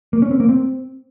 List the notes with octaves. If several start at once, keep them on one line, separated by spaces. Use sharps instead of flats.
A#3
C#4
C4
A#3
C4